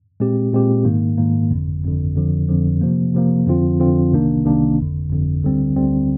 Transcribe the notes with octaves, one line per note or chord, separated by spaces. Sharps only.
A#2 G#3 C4 G4
A#2 G#3 C4 G4
G#2 D#3 A#3
G#2 D#3 A#3
G1 F2 D3
G1 F2 D3
F2 D3 F3
F2 D3 F3
C3 F3 A#3
C3 F3 A#3
F2 D3 F3 C4 F4
F2 D3 F3 C4 F4
C2 C3 D#3 A#3 D4
C2 C3 D#3 A#3 D4
G1 F2 D3
G1 F2 D3
D2 D3 G3 C4
D2 D3 G3 C4